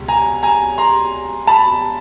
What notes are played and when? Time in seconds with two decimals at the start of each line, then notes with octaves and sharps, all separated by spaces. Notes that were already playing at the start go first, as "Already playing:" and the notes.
Already playing: C#2 B2 G3
0.08 G#5 A#5
0.43 G#5 A#5
0.78 A#5 C6
1.47 A5 B5